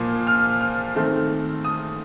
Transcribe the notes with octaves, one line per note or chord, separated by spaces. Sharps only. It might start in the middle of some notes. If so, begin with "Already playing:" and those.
Already playing: A#2 F3 A#3
F6
F6
D#3 A3 C4
D#6